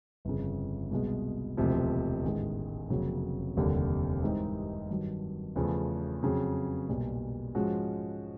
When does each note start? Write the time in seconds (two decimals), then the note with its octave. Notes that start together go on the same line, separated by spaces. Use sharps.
0.25 G1 F2 C#3
0.91 C2 B2 G#3
1.57 E1 D2 C3 F3
2.24 A1 G#2 D#3 G#3
2.90 F1 F2 C#3 F#3 A#3
3.57 F1 D#2 D3 G3
4.23 G#2 E3 G3 C4 D#4
4.90 G2 D#3 F#3
5.56 E2 C#3 F3 A3
6.23 F2 C#3 F#3
6.89 B1 A#2 G3
7.55 G#2 F3 G#3 C#4 F#4